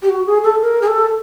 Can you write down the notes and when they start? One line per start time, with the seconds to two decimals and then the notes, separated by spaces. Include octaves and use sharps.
0.02 G4
0.09 F#4
0.26 G#4
0.44 A4
0.61 A#4
0.81 G#4
0.87 A4